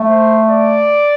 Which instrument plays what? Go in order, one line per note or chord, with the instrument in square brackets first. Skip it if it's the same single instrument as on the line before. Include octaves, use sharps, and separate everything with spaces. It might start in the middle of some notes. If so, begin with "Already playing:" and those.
Already playing: [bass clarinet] A3
[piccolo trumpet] C5
D5